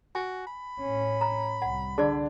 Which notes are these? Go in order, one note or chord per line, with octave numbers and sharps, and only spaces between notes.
F#4 G#5
B5
A2 C#4
A#5
C2 F#5
D3 D4 G#4 D5